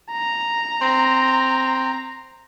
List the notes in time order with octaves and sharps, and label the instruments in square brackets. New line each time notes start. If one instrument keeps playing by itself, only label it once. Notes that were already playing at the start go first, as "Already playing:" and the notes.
[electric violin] A#5
[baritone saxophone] C4